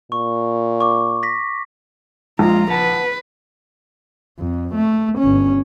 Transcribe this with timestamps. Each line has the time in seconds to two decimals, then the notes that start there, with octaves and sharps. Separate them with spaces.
0.12 A#2 C#6
0.81 C#6 D6
1.23 A#6 B6
2.39 A#1 G#3 F4 A#5
2.70 B4 F#5 A5
4.39 F2
4.75 A3
5.19 G1 C#4